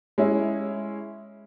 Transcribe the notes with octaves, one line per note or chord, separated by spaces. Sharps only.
G#3 C#4 E4